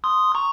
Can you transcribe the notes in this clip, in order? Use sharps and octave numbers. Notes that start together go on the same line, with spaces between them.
C6 D#6
A#5 C#6